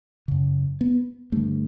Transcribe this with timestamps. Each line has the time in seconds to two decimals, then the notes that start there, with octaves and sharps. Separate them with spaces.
0.28 F#2 C#3
0.81 B3
1.32 G2 D3 A3